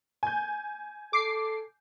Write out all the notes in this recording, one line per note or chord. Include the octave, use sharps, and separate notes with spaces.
G#5 G6
A4 D6 C7